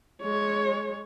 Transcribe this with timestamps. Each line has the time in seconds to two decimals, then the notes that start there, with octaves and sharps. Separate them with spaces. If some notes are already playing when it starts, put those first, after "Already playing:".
0.23 G#3 C#5